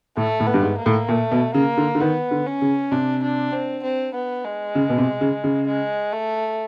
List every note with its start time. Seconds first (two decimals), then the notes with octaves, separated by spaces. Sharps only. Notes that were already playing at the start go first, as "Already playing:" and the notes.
0.17 A2 A3
0.40 A2
0.47 B3
0.54 G2
0.62 G#2
0.78 A#3
0.86 A2
1.08 A#2 A3
1.31 B2
1.54 C#3 A#3
1.78 D3
1.95 D3
2.00 D#3 B3
2.31 D3
2.46 C#4
2.62 C#3
2.92 C3 D4
3.23 D4
3.53 C4
3.83 C4
4.14 B3
4.44 G#3
4.75 C#3
4.89 B2
4.98 C3
5.21 C#3
5.44 C#3
5.67 G#3
6.13 A3